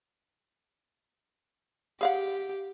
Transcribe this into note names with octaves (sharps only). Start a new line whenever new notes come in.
G4 G#4 F5 F#5